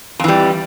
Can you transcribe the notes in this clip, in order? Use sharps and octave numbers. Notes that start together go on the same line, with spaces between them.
F2 E3 G3